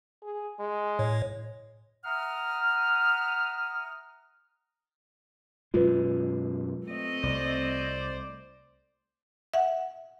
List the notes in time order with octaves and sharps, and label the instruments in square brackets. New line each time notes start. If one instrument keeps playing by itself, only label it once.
[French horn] G#4
G#3
[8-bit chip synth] A2 C#5
[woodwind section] E5 F#5 A#5 D#6 F6
[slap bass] F#2 B2 G#3 [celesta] F4 B4
[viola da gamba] A3 C4 D#5
[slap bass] C2 [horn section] C5 D5
[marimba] E5 F#5